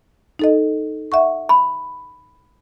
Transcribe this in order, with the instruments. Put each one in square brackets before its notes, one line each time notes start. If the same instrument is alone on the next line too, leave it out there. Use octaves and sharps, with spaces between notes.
[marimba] D#4 A4 D#5
E5 F#5 C#6
[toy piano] B5